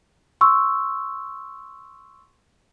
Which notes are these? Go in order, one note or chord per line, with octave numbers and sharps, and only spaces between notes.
C6 C#6 E6